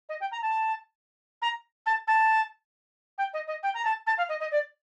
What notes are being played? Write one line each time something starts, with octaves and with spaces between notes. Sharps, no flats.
D#5
G5
A#5
A5
A#5
A5
A5
G5
D#5
D#5
G5
A#5
A5
A5
F5
D#5
D#5
D5